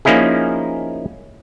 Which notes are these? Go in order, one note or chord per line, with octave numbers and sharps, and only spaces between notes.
F3 A#3 C#4 D#4 E4 G#4